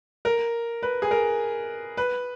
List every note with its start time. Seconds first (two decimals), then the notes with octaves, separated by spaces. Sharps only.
0.25 A#4
0.83 B4
1.02 G#4
1.11 A#4
1.97 B4